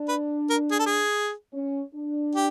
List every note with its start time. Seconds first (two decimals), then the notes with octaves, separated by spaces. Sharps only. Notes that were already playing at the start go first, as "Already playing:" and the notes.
Already playing: D4
0.09 B4
0.50 A#4
0.71 G#4
0.79 A4
0.86 G#4
1.53 C#4
1.95 D4
2.35 G4